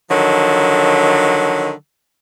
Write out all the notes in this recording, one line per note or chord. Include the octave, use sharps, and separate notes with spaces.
D3 D#3 F3 F#3